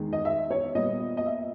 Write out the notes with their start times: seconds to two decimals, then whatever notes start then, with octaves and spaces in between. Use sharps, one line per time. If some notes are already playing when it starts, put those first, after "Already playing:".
Already playing: E2 D#3 G#3
0.13 D#5
0.25 E5
0.51 C#5
0.75 A#2 G3 B3 D#5
1.17 D#5
1.26 E5